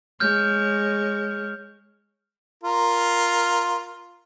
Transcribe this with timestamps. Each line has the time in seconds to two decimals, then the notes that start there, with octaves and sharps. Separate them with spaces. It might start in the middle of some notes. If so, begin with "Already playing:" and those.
0.20 G#3 C#5 F6 G6
2.64 F4 A#4